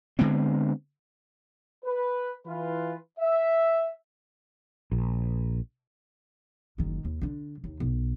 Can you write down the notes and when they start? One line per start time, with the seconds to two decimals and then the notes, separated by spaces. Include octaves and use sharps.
0.19 D3 G#3 B3 C4
1.85 B4
2.46 E3 F4 B4
3.19 E5
4.92 A#1
6.78 F#1 D#3
7.05 D#2
7.21 D3 D4
7.64 D#2
7.80 B1